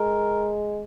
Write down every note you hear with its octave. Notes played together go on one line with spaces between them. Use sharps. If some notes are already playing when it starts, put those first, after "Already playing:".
Already playing: G#3 A#4